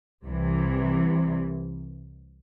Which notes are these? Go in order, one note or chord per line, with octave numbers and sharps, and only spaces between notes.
C2 C3 E3